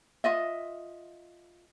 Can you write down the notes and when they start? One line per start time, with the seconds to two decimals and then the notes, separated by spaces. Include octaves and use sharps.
0.24 F4 D#5 E5